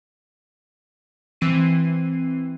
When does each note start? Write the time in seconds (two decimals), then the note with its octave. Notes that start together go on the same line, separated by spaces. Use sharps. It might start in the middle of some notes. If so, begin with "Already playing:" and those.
1.41 E3 C4 C7 D#7